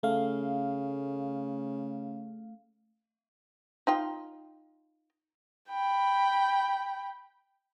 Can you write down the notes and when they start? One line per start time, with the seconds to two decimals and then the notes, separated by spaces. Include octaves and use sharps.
0.03 C#3 A3 F5
3.87 D#4 F4 G5
5.70 G5 B5